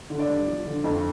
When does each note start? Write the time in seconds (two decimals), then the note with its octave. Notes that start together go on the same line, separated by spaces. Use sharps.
0.10 D3
0.19 D5
0.29 G2
0.47 F3
0.66 D3
0.84 F2